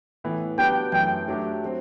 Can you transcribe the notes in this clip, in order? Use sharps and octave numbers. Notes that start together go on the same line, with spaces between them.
A2 E3 B3
F#3 B3 D4 G4 B4 G5
F#2 E3 A3 G5
F#3 A3 D4 G4
F#3 C4